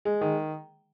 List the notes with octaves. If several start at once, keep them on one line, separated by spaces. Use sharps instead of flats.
G#3
D#3